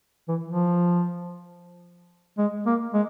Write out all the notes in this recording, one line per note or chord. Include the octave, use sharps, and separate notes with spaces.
E3
F3
G#3
A#3
G#3